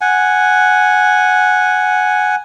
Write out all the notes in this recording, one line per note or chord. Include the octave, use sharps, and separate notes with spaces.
F#5 G#5